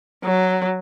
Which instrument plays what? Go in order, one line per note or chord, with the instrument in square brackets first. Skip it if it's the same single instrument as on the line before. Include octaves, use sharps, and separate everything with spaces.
[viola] F#3